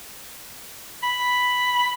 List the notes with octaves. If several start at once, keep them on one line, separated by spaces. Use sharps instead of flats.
B5